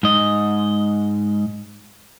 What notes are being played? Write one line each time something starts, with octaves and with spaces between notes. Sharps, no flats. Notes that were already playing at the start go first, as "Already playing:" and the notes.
G#2 D#5